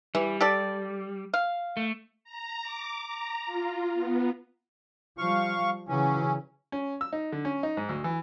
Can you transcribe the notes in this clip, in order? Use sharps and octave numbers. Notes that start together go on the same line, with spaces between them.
E3 G3
G4 A4 D5
F5
A3
A#5
D6
A#5
F4
B3
F3 G3 F5 C#6
C#3 E3 F#3 C#4
C#4
E6
D#4
D3
C#4
D#4
G#2
D2
E3